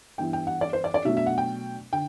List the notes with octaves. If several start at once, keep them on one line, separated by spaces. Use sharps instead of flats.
G2 E3 B3 E4 G5
G5
F#5
D5
C5
D5
D5
B2 F#3 A3 D4 E5
E5
F#5
G5
D3 G5